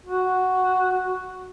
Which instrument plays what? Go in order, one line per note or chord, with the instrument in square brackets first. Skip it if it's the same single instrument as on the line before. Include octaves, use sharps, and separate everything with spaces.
[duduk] F#4